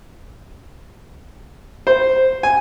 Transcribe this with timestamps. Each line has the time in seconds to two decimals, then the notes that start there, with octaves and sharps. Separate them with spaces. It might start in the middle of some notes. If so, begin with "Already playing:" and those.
1.87 C5
2.43 G#5